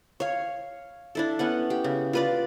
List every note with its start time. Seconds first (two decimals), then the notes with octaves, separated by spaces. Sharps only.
0.20 C#5 F5
1.15 D4 E4 A4
1.39 B3 C#4 F#5
1.70 G4
1.84 C#3
2.13 F4 B4 D5